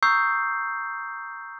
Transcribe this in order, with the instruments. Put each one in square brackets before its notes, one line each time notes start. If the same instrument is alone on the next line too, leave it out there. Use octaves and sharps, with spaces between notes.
[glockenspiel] A#5 C#6 D#6 E6 G6 C7